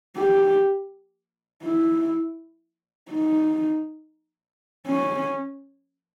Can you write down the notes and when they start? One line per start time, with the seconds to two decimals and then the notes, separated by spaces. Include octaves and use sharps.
0.16 G4
1.63 E4
3.11 D#4
4.87 C#4